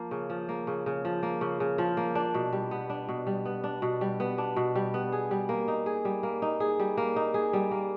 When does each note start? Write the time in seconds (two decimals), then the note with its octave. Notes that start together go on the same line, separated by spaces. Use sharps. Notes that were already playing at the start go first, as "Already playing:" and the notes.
Already playing: F3 A#3
0.11 C#3
0.30 F3
0.49 A#3
0.67 C#3
0.86 C#3
1.05 F3
1.23 A#3
1.41 C#3
1.60 C#3
1.78 F3
1.97 A#3
2.15 D4
2.34 B2
2.53 G3
2.71 B3
2.90 D4
3.09 B2
3.27 G3
3.45 B3
3.64 D4
3.82 B2
4.01 G3
4.20 B3
4.38 D4
4.56 B2
4.75 G3
4.94 B3
5.12 G#4
5.31 G3
5.49 A#3
5.68 D#4
5.86 G#4
6.05 G3
6.23 A#3
6.42 D#4
6.60 G#4
6.80 G3
6.97 A#3
7.16 D#4
7.34 G#4
7.53 G3
7.71 A#3